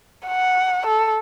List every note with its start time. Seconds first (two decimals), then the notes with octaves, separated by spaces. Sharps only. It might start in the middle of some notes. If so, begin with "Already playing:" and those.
0.28 F#5
0.86 A4